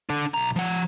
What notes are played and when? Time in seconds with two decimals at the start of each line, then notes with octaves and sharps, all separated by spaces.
0.09 D3 D4
0.34 B1 A#5
0.56 F3 F#5